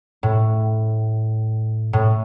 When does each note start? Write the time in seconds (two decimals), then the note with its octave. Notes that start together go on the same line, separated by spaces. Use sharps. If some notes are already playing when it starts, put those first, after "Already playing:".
0.23 A2
1.93 A2